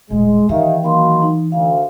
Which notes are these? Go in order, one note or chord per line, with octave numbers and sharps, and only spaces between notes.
D#1 A#2 G#3
D#3 E3 G4 E5 F5
D#3 F#3 A#3 F5 B5 C6
D#4
D2 F5